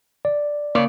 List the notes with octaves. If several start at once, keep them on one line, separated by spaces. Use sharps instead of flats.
D5
C#3 A#3 C#5 D5